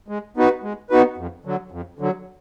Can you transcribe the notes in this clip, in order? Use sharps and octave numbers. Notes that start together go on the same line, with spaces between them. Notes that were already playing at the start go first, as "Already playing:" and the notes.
G#3
B3 D#4 F#4 B4
G#3
B3 D#4 F#4 B4
F2
D3 F#3
F2
D3 F#3